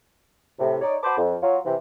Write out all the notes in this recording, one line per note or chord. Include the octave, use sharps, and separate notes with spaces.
A2 C3
D#4 C#5 D5
F#4 C5 A5 B5 D6
F2
F#3 F4 C#5
C3 E3